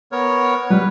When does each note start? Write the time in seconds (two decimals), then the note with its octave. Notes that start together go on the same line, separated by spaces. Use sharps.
0.12 B3 A#4 C#5
0.70 G3 B4